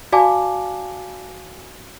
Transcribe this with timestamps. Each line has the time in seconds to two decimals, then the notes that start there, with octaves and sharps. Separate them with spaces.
0.12 F#4 D5 F5 G#5 A5 D6